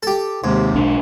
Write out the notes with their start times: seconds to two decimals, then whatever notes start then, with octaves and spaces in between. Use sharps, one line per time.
0.03 G4 A4
0.44 D#2 G#2 C3
0.74 B1 D4